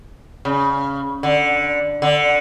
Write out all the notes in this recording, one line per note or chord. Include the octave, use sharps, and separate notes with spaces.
C#3
D3
D3